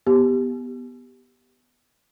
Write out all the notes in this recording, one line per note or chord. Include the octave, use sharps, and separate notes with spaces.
B3 G4